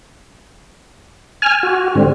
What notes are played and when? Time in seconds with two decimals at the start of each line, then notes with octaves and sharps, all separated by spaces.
1.42 G#5 F6
1.63 F#4
1.95 G#2 D3 G3 C4